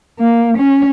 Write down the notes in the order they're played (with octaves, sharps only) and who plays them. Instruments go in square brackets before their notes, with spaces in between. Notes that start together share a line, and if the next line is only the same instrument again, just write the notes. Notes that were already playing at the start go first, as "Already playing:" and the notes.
[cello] A#3
C#4